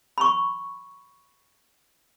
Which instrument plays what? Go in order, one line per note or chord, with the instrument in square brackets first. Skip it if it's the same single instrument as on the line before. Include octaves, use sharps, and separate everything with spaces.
[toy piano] B5 C#6